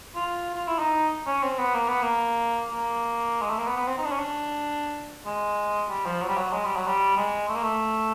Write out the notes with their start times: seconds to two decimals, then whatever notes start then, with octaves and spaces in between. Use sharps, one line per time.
0.15 F4
0.54 F4
0.67 E4
0.79 D#4
1.26 C#4
1.43 C4
1.58 B3
1.74 A#3
1.88 B3
2.02 A#3
2.71 A#3
3.41 G#3
3.49 A3
3.58 A#3
3.66 B3
3.77 B3
3.87 C4
3.98 D#4
4.04 D4
4.12 C#4
4.19 D4
5.26 G#3
5.89 G3
6.06 F3
6.22 F#3
6.28 G3
6.37 F#3
6.53 G#3
6.65 G3
6.76 F#3
6.88 G3
7.17 G#3
7.49 A3
7.55 A#3
7.63 A3